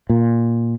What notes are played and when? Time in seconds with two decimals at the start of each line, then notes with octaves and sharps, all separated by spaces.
0.09 A#2